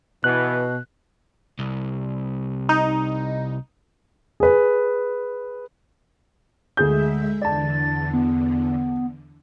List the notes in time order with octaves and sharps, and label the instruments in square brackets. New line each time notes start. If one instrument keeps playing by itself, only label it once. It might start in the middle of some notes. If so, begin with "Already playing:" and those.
[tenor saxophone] B2 [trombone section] E3 B3 [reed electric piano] F#6
[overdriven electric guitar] C2
[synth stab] D#4
[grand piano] G#4 B4
[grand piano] D2 G#4 G6 [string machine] G#3 E5
[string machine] E2 D3 [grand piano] D5 A5 [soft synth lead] A6
[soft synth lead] B3